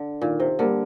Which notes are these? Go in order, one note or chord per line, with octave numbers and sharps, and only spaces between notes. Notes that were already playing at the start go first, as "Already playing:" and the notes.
Already playing: D3
A#2 D#3
C3
D3 G3 A#3